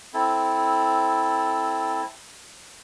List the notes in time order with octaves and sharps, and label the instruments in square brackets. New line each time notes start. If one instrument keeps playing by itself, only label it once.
[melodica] C4 E4 A4